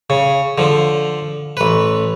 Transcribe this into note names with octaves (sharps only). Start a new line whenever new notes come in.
C#3
D3 F3
A1 B4